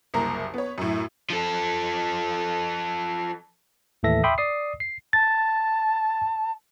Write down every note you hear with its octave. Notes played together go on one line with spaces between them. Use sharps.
F#1 C2 A#3 A#5
B3 C#5
F#2 A2
F3 A4
D#2 A2 E3 A4 E5 A#6
E5 G5 B5 C6 D6 D#6
D5 D#6 C7
C7
A5 A6